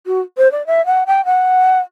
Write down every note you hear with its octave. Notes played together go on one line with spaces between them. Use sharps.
F#4
C5
D5
E5
F#5
G5
F#5